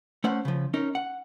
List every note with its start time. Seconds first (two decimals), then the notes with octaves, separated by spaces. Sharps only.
0.24 A3 C#4 C5 F#5
0.45 C#3 F3
0.74 C#4 D#4 A#4
0.95 F#5